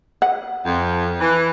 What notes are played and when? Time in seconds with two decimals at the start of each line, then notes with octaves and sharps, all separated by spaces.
0.22 F#5
0.65 F2
1.20 E3